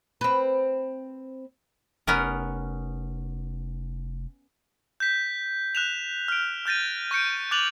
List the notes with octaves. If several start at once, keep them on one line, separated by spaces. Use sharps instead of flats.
C4 B4
F1 B3 C#4 A#4
G6 B6
F#6 E7 F7
F6 D7
F6 G6 A6 A#6 D#7
C#6 G6 C#7 D7
D6 F#6 A6 F7 F#7